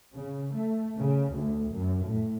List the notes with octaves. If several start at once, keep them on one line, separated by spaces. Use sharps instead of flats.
C#3
A3
C#3
D2
F#2
A2